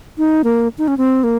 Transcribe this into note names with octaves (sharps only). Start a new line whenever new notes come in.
D#4
A#3
D#4
C#4
C4
A#3